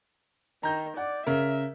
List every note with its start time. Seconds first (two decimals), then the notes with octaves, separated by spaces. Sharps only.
0.63 D#3 A#5 G6
0.97 D5 F#5
1.27 C#3 A#4 E5